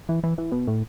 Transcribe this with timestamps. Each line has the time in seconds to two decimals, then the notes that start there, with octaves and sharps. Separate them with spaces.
0.09 E3
0.24 E3
0.38 E3
0.52 B2
0.67 A2